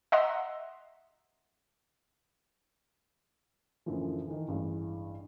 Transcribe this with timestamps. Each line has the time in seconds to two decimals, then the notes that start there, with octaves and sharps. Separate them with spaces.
0.12 D#5 E5 F#5 A#5 C6
3.86 F#2 A2 D3 E3 F3
4.28 D#3 E3
4.48 A1 G2 E3 G#3